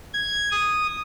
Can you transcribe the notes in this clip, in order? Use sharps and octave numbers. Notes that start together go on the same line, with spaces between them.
G#6
D#6